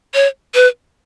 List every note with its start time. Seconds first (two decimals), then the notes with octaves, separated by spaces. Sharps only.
0.14 C#5
0.54 B4